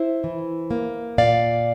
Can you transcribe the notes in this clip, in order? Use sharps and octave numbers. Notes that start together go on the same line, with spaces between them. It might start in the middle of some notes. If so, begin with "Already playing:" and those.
Already playing: E4 C5 E5
E3
A#3
A#2 D5 F5